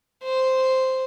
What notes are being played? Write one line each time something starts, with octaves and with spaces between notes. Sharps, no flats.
C5